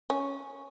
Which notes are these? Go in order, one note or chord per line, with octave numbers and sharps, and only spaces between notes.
C#4